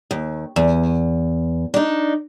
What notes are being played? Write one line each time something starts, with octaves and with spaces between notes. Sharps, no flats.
D#2
E2
D4 D#4